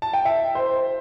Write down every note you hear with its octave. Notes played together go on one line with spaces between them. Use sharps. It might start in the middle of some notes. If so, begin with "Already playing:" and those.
A5
G5
E5
C5